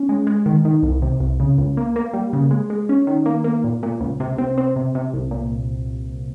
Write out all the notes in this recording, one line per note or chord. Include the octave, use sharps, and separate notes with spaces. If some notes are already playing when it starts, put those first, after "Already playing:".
Already playing: C#4
G#3
G#3
D#3
D#3
C2
C3
C2
C#3
C#2
A#3
A#3
G3
C#3
G#3
G#3
C#4
D#3
A#3
A#3
A#2
A#2
C#2
C3
C4
C4
C3
C3
C2
A#2